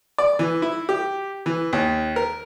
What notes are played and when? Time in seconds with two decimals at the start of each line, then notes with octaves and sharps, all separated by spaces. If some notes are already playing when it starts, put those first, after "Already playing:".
0.18 D5
0.39 E3
0.62 E4
0.89 G4
1.46 E3
1.73 D#2
2.16 A#4